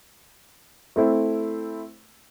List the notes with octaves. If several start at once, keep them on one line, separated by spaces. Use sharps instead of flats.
A3 C4 E4